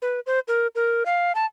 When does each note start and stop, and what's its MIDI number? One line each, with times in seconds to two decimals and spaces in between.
0.02 0.20 71
0.27 0.40 72
0.48 0.67 70
0.75 1.04 70
1.06 1.32 77
1.35 1.46 81